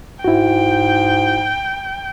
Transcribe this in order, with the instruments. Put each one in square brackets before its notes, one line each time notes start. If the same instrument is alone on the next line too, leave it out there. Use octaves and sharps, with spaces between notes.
[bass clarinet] G#2 [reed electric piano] E4 F#4 [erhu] G5